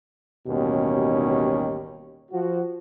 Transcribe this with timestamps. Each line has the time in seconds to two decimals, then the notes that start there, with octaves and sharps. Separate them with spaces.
0.47 A1 D#2 B2 G3 C#4 D#4
2.31 F3 F#4